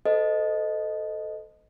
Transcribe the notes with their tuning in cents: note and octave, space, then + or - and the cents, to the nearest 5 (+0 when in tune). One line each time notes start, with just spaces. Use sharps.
A4 +0 C5 -35 D#5 +0